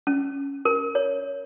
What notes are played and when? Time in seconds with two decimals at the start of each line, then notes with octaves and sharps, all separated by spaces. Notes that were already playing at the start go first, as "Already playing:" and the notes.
0.07 C#4
0.65 A#4
0.95 C#5